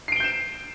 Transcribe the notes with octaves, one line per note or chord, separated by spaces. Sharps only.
G6 C7 D7 E7 G7